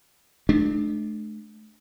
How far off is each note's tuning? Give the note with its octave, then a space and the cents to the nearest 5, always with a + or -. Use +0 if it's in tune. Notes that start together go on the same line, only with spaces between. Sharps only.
A3 -35 D4 +25